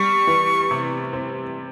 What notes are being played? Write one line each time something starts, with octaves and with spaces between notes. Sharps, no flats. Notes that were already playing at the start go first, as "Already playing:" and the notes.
Already playing: G3 C#6
E3
C3
C4